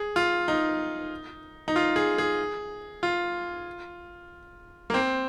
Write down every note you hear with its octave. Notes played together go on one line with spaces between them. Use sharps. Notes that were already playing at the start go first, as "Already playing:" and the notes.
Already playing: G#4
F4
D#4
D#4
F4
G#4
G#4
F4
A#3
C4